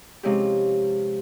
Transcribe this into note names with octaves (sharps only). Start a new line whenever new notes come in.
C3 F3 G#3 C#4 E4 G4